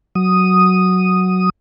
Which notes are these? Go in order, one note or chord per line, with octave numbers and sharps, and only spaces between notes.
F#3 D#6